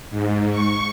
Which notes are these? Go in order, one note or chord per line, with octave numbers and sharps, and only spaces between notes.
G#2
C#6